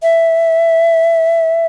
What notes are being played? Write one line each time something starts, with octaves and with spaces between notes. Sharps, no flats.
E5